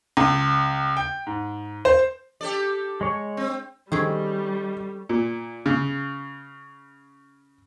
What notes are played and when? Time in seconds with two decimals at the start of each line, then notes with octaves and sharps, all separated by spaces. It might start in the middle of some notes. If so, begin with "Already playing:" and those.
0.17 C#2
0.97 G5
1.27 G#2
1.85 C5
2.41 G4 A4 D5
3.01 G#3 C#5
3.37 C4
3.92 D#3 G3 C4 C#4 G#4 A4 C#6
5.09 A#2
5.66 C#3